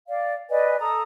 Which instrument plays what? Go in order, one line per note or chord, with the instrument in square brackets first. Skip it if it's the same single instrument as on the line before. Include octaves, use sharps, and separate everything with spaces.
[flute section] D5 F5
B4 D5 D#5 G#5
A4 A#5 D#6